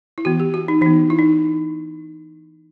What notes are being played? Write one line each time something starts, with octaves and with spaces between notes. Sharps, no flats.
E4
E3 B3 F#4
G4
F#4
D#4
E3 B3 D#4
E4
D#4